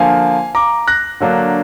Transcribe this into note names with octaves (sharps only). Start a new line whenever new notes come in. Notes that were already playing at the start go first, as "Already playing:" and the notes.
Already playing: D3 F3 A#3 F5 G#5
A#5 D6
F#6 A#6
D3 F#3 A#3 D4